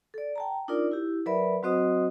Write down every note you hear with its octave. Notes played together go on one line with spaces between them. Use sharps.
A4 D5
G5 A5 A#5
D4 D#4 F4 A#4 D5
E4 G4
F#3 A#4 B4 D5 E5 B5
F#3 C4 F#4 C5 D#5 D#6